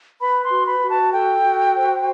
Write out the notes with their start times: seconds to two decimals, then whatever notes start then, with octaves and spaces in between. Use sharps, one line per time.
0.20 B4 B5
0.43 C6
0.50 F#4
0.66 B5
0.81 F#4
0.89 A5
1.12 A4 G5
1.43 F#4
1.74 C5